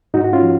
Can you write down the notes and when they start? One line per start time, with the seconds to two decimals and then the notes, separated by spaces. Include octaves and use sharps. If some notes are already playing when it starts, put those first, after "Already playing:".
0.14 G#2 D#4 F#4
0.24 F#4
0.33 C#4 F4
0.42 F3